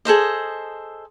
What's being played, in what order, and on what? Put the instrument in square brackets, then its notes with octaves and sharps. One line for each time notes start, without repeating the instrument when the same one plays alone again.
[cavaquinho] G#4 A4 C5 D#5